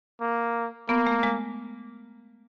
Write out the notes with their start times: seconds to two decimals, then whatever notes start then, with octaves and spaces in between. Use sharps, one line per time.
0.21 A#3
0.89 A#3 B3
1.07 A3
1.23 G#3